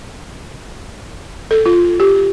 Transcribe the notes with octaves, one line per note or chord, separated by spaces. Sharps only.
A4
F4
G4